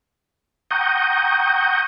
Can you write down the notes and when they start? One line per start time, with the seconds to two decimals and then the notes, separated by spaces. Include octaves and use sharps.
0.71 F#5 G5 A#5 C#6 D#6 G6